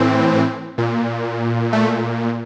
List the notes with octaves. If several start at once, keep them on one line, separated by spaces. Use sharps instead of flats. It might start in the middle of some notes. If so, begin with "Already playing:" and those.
Already playing: A2 E3 C4
A#2
A3